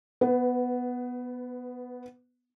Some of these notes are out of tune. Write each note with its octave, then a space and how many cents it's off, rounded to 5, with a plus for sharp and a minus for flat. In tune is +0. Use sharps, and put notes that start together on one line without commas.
B3 +0 B4 +25